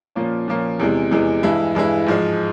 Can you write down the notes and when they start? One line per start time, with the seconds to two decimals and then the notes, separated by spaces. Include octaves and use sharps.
0.15 A#2 F3 A#3 C#4
0.48 A#2 F3 A#3 C#4
0.80 E2 C3 E3 G#3
1.11 E2 C3 E3 G#3
1.43 G2 E3 G#3 E4
1.75 G2 E3 G#3 E4
2.06 G#2 F3 G#3